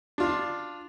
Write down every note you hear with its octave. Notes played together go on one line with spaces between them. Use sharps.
D4 F4